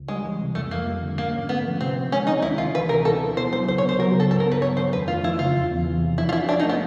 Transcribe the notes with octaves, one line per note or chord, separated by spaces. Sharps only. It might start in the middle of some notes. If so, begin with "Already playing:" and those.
Already playing: C#2
G3 G#3
E3
C3
F2 A3
F2 A#3
G3
D3
G#2 A#3
C#4
A3 B3
F3
C3 C4
C4
G#3 C#4
D#3 D#4
D2 E4
D2 F4
E3 B4
C3 A#4
B2 A4
E4
B3 C5
F#3 C5
C#2 C5
C#5
B3
C5
F#3 A#4
C#3 A4
G2 A4
A#4
B3
B4
F#3 C#5
D#3 C5
F2 B4
A3 F4
F3 E4
C#3 F4
E2
E2
E3
C3
F3 E4
F4
E4 F#4
C#4 D4
D#4
A3 B3